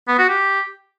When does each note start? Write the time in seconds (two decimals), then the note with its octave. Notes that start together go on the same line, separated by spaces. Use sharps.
0.08 B3
0.18 F#4
0.29 G4